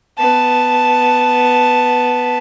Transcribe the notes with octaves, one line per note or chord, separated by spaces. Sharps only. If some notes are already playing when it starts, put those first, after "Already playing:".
B3 A5